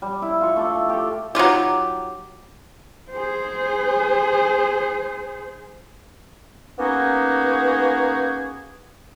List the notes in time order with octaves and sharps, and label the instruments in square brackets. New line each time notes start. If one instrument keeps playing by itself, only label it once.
[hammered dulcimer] G3
E4
F4 C#6
A3 A4 D6
G4 A4
[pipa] F#3 D#4 F4 G4
[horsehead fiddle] G#4 C5
[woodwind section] A#3 B3 C#4 D#4 F#4 G#4